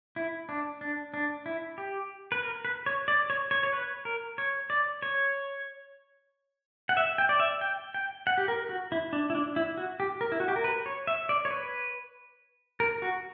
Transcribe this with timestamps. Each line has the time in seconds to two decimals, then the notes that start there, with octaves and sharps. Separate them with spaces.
0.16 E4
0.49 D4
0.81 D4
1.14 D4
1.46 E4
1.78 G4
2.32 B4
2.43 A#4
2.65 B4
2.86 C#5
3.08 D5
3.30 C#5
3.51 C#5
3.63 C#5
3.73 B4
4.05 A#4
4.38 C#5
4.70 D5
5.02 C#5
6.89 F#5
6.97 E5
7.18 G5
7.29 D5
7.40 E5
7.61 G5
7.94 G5
8.27 F#5
8.38 G4
8.48 A#4
8.69 F#4
8.92 E4
9.13 D4
9.30 E4
9.35 D4
9.56 E4
9.78 F#4
10.00 G4
10.21 A#4
10.32 E4
10.40 F#4
10.48 G4
10.56 A#4
10.64 B4
10.86 C#5
11.07 E5
11.29 D5
11.45 C#5
11.50 B4
12.80 A#4
13.02 F#4